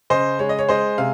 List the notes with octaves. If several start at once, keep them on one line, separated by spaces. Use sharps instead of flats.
C#3 C5 D#5
G#3 C#5
D#5
C#5
G#3 C5 D#5
C3 F5